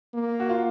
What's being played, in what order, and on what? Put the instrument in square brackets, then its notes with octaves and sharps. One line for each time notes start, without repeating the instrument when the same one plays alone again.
[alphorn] A#3
[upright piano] F#4
F4